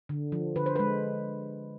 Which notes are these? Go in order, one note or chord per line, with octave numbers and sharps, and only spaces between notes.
D3
F3
D3 B4
C5
B4
G#3